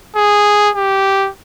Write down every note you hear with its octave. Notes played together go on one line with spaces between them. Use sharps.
G#4
G4